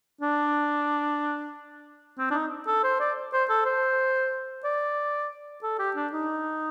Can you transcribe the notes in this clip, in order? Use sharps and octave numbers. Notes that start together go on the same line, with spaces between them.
D4
C4
D4
D#4
A4
C5
D5
C5
A4
C5
D5
A4
G4
D4
D#4